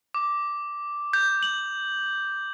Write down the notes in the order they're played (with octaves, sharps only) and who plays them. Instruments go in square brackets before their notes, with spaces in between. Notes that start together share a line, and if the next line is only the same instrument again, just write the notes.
[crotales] D6
G6
F#7